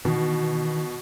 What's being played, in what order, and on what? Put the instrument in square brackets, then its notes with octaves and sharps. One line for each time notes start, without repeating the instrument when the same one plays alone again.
[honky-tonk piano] B2 [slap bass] D#3 E3